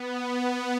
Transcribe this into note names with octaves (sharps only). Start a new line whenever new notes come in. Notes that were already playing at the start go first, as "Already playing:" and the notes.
Already playing: B3
B3